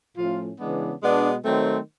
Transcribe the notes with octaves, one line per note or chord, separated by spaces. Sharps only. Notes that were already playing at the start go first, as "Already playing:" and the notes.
A2 F3 A3 C#4 F4
C#3 E3 G#3 B3 D4
B2 G#3 B3 D4
D#3 F#3 A3 C4